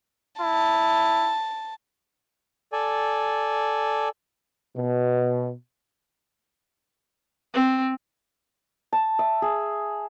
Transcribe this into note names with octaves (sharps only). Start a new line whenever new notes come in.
E4 A5
A4 D5 G#5
B2
C4
A5
E5
G#4